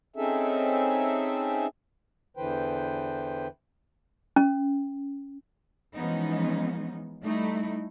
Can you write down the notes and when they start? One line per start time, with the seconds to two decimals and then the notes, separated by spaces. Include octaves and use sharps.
0.16 C4 C#4 D#4 G#4 A4 E5
2.37 E2 D3 E3 B4 C5 G5
4.36 C#4
5.95 E3 F3 G#3 B3 C#4 D#4
7.23 G3 A3 D#4 E4